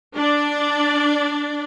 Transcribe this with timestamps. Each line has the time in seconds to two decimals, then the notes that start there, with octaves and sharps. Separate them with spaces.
0.17 D4 D5